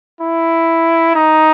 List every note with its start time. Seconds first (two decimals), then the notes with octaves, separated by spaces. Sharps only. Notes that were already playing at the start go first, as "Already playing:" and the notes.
0.21 E4
1.15 D#4